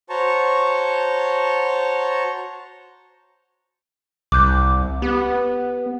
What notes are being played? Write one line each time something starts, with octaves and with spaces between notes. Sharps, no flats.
F#4 C5 C#5 A5 A#5 C#6
C2 D6 F#6 G6
B3 G4